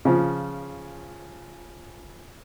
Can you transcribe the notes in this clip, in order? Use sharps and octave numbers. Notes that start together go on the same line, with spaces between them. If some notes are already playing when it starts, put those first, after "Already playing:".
C#3 F3